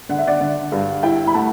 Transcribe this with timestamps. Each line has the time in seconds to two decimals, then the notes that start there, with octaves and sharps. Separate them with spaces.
0.09 D3 F#5
0.18 E5
0.27 D5 F#5
0.41 D3
0.72 G2
1.03 E4 E5 G5
1.27 B5
1.34 A3 F#5 A5